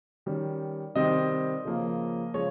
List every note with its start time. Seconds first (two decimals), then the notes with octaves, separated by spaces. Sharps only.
0.26 D#3 G3 C#4
0.95 C3 D#3 G3 C4 D#5
1.65 C#3 F3 A#3 C#4
2.34 C#3 F3 G#3 C#5